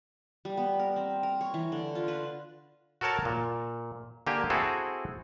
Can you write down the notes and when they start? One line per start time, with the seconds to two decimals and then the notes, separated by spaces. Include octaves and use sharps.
0.45 G3
0.57 B3
0.79 A#4
0.96 C4
1.23 A#4
1.41 C#5
1.54 E3
1.72 D3
1.95 F4
2.08 B4
3.01 F#4 A4 A#4 C#5 A5
3.25 A#2
4.27 D3 A#3 G4 G#5
4.50 C4 E4 F#4 G#4 A4